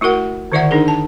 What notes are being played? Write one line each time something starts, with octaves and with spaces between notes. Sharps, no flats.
A3 E4 F#4 A#4 F#5
D3 D#3 E4 D5 E5 F#5
D4 D#4 G#4 A#4
A5